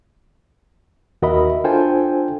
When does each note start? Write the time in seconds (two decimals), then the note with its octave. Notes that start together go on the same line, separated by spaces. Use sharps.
1.22 D#2 F#4 A#4 D#5 E5 B5
1.64 D4 F4 A4 C5 G5 G#5